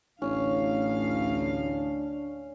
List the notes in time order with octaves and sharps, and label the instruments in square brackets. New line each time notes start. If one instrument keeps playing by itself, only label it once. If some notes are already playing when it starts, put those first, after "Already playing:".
[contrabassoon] A1 [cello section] D2 A2 F5 [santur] C#4 [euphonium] D4